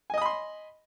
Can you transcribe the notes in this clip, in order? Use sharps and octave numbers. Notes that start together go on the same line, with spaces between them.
D#5 G#5 B5 C6 D#6